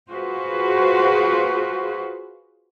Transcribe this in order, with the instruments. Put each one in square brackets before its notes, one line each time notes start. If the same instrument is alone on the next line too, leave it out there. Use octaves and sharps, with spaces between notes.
[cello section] F4 F#4 G#4 B4 C5